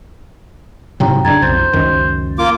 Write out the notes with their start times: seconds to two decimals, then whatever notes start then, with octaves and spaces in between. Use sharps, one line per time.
1.00 G#2 C3 F#3 E4 G5 A#5
1.25 F#2 C#3 D4 A#5 G#6 A6
1.42 B1 F2 C5 A6
1.73 C#2 F#2 D#3
2.39 A#3 F4 D6